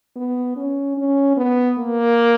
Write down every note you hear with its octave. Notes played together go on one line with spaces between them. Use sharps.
B3
C#4
C#4
B3
A#3